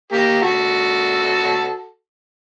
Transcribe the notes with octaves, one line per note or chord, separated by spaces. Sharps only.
A#3 G4
F#4 A4